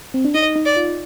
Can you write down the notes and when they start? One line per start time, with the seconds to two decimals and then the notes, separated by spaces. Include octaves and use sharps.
0.14 C4
0.25 D4
0.34 D#4 D#5
0.56 D#4
0.66 D5
0.76 F4